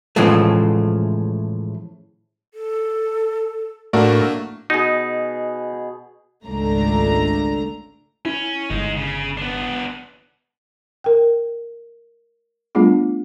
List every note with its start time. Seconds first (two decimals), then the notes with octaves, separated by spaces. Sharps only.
0.16 A2 C#3 E3 F3 G#3 A3
2.54 A4
3.93 A2 A3 A#3 D4 F#4 A#4 D5
4.70 B2 D#4 G#4
6.45 G#1 C#2 A3 D4 A#5
8.25 C#4 E4
8.70 G1 G#3 D#4
8.97 C#3
9.37 B3 D4
11.04 A#4 G5
12.75 G3 A3 B3 D4 F4 G#4